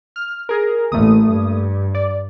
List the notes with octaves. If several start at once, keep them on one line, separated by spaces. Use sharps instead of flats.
F6
G#4 A#4
A1 A3 A#3 D#6
G2
D5